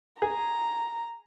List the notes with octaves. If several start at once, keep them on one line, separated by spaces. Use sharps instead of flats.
G#4 A#5